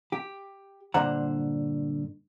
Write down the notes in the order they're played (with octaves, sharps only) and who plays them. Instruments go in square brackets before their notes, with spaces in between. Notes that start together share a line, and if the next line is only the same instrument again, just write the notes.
[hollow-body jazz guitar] G4
G2 A#2 D3 C5 F#5 A#5